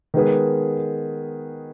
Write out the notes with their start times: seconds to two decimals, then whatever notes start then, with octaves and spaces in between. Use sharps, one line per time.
0.14 D#3 G#3 B3 G#4 B4